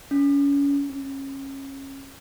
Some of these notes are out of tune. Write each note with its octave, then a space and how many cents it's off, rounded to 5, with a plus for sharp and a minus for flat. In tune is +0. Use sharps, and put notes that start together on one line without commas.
C#4 +30
C#4 -25